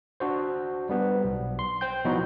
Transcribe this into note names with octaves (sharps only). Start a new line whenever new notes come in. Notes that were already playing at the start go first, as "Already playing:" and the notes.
D4 F#4 C5
G3 B3
B1
C6
C5 G5 G6
B2 F3 F#3 D#4 E4 F#4